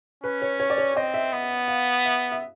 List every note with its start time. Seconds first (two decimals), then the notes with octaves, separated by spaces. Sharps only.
0.24 C#4 B4
0.42 C#5
0.60 C#5
0.70 D5
0.78 C#5
0.96 C4 D#5
1.14 E5
1.33 B3
1.68 F5
2.05 E5
2.32 E5